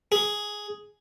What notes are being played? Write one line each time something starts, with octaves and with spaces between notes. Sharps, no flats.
G#4